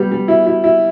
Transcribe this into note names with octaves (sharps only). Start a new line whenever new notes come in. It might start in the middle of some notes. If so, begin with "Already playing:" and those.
Already playing: G3 B3
G3
E4
E4
E4